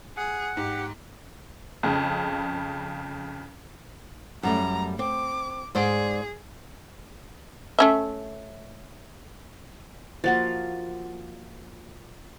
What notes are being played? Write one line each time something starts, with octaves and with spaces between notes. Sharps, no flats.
G#4 F#5
G#2 G4
F2 C#3
F#2 G3 A3 A#5
C4 D6
G#2 G#4 C5 D5
A3 C#4 E5
F3 A#3 F4 F#4 F#5 A6